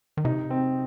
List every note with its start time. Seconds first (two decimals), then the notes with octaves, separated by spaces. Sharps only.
0.17 D#3
0.25 C3 D#4
0.50 C4